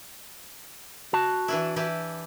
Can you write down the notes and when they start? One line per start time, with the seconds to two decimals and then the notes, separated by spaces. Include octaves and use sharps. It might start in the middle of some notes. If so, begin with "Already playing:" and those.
1.13 F#4 A5
1.48 E3 D4 E4
1.76 E3 E4 G4